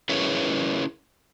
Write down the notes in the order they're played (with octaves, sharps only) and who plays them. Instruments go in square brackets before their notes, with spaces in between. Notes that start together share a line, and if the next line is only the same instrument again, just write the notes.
[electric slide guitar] C#4 E4 G#4 A#4 B4 C#5